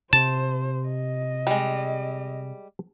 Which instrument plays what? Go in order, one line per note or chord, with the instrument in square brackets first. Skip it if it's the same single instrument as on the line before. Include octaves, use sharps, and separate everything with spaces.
[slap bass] C3 [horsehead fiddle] C5 [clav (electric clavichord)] A5
[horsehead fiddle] D#5
[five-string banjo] G3 G#3